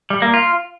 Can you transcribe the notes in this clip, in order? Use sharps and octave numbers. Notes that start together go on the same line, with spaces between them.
G3
A#3
F4